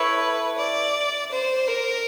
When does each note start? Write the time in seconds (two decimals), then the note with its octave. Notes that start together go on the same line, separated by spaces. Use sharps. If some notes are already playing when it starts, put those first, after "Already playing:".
Already playing: E4 A4 B4 C#5 E5
0.58 D5
1.31 C5
1.68 A#4